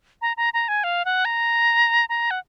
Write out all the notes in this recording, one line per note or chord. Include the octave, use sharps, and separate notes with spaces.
A#5
A#5
A#5
G#5
F5
F#5
A#5
A#5
F#5